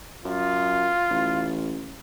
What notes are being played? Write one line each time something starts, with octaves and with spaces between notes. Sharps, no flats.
F#2 F4
A1